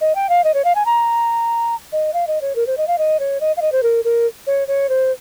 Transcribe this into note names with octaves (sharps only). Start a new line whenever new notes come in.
D#5
G5
F5
D#5
C#5
F5
G#5
A#5
D#5
F5
D#5
C#5
A#4
C5
D#5
F5
D#5
C#5
D#5
F5
D#5
C5
A#4
A#4
C#5
C#5
C5